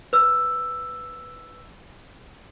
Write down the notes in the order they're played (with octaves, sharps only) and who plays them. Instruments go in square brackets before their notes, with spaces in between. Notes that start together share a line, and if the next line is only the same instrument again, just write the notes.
[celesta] B4 E6